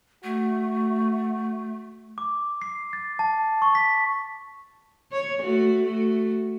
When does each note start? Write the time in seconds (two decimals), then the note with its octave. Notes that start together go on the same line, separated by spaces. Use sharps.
0.24 A3 F#4
2.18 D6
2.62 C7
2.93 A6
3.19 A5
3.62 C#6
3.75 B6
5.12 C#5
5.42 A3 F#4
5.83 A3 F#4